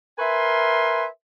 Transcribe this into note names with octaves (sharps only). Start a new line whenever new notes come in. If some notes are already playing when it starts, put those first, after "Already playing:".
A#4 B4 E5 G#5 C6